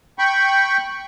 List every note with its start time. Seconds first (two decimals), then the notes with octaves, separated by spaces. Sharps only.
0.19 G5 B5 C#6